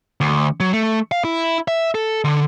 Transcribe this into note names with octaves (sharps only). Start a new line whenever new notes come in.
D2
F#3
A3
F5
E4
E5
A4
D3